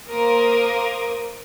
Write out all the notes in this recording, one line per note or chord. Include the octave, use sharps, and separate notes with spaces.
A#3 A#4 C5 D6 D#6